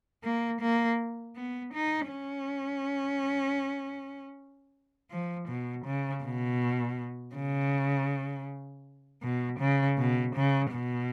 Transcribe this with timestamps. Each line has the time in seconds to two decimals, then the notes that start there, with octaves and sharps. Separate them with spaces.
0.24 A#3
0.61 A#3
1.36 B3
1.74 D#4
2.11 C#4
5.11 F3
5.48 B2
5.85 C#3
6.23 B2
7.35 C#3
9.23 B2
9.60 C#3
9.98 B2
10.35 C#3
10.73 B2